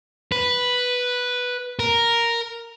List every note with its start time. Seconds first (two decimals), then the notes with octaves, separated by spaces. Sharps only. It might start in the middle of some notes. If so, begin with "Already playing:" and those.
0.32 B4
1.79 A#4